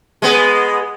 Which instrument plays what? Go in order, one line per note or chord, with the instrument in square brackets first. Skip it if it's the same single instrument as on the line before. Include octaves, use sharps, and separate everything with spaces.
[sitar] G#3 B3